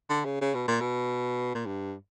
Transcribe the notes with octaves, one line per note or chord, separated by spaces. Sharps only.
D3
C#3
C#3
B2
A#2
B2
A#2
G2